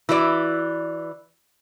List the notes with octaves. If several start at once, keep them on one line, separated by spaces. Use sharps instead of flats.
E3 E4 F#4 D5